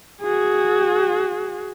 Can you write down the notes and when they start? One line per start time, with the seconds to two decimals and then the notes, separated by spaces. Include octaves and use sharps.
0.22 F#4 G#4